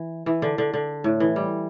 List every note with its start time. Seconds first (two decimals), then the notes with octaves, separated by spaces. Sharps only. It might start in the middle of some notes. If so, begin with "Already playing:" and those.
Already playing: E3
0.26 E3
0.42 D3
0.58 D3
0.74 D3
1.04 A2
1.20 E3
1.36 G3